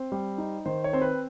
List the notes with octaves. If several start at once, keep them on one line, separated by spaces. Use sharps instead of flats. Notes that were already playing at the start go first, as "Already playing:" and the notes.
Already playing: C4 C5
G3
D#4
D#3 C5
C#5
C4 C5
B4